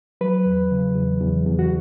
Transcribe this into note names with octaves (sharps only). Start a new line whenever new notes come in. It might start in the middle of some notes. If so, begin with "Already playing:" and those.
F#3 B4
E2
C#3
E2
E2
E2
F#4